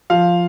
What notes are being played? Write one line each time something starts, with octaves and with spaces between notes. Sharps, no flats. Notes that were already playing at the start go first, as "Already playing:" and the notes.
F3 F5